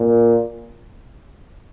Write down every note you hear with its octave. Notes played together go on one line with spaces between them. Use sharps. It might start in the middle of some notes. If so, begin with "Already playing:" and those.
Already playing: A#2